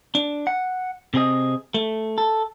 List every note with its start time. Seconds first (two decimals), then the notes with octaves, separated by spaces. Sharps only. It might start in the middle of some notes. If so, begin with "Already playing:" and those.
0.15 D4
0.47 F#5
1.14 C3 C4 G#4 D#5
1.74 A3
2.18 A4